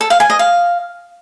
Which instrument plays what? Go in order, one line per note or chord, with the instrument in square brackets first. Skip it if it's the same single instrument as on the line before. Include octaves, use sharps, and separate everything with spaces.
[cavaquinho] A4
F5
G#5
D#5
F5